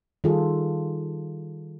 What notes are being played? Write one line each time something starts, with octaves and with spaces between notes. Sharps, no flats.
D#3 G3 F4 G#4 A4